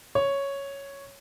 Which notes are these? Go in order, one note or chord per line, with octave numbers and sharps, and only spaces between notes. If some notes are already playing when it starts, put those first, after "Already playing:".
C#5